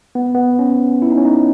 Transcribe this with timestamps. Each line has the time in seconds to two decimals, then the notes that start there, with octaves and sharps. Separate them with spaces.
0.15 B3
0.34 B3
0.59 C#4
1.02 E4
1.10 D#4
1.17 C#4
1.25 D#4